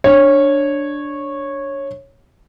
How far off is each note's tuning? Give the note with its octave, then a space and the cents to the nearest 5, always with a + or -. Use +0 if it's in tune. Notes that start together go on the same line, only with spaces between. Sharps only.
D4 +0 C#5 -15